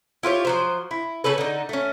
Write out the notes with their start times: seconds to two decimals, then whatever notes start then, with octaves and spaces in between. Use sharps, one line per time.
0.23 E4 F4 G4 C#5
0.45 F3 F#3 C5
0.91 E4
1.24 C#3 C#4 A4 B4
1.38 D3 D#4
1.69 A3 C#4